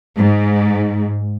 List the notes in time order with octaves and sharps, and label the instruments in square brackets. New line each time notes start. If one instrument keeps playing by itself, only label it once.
[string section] G#2